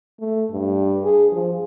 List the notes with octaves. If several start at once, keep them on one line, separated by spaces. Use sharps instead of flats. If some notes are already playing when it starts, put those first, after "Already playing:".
A3
G2
G#4
F3